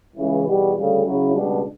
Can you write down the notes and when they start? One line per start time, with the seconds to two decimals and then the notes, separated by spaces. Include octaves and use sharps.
0.17 C#2 C#3 E3
0.46 E2 B2 G3
0.75 D2 C#3 G3
1.04 C#3 F#3 C#4 E4
1.33 C#2 B2 G3 D4